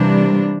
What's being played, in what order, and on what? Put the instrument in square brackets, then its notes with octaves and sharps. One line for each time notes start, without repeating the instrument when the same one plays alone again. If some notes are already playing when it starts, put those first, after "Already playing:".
Already playing: [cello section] C3 E3 G3 A#3 D4